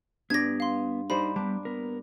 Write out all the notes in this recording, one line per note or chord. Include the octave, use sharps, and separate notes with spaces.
G2 B3 D5 G#6 A#6
F5 C6
G3 A#3 D#4 C5 B5
G3 B3 D4
B3 A#4